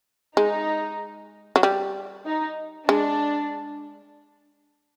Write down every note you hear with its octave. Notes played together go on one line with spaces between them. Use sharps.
G#3 D#4
F#3
G3
D#4
G#3 D4